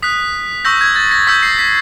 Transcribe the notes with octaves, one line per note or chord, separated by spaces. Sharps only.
D#6 F#6 B6
C#6 E6 G6 A#6
G#6
A6
A#6
C#6 E6 G6 B6
C7
B6